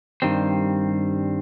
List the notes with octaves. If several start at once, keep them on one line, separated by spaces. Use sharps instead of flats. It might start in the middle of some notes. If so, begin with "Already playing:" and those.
G2 D#3 G3 C4